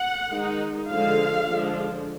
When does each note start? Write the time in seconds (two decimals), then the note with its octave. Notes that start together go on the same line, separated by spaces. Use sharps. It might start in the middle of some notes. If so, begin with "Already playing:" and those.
Already playing: F#5
0.28 D#3 G#3 D#4
0.89 D3 F3 G#3 F5
1.50 D3 F3 G#3 D4